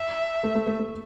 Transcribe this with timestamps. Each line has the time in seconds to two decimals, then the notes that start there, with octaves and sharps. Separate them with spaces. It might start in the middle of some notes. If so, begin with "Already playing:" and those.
Already playing: E5
0.43 A3
0.55 A3
0.67 A3
0.79 A3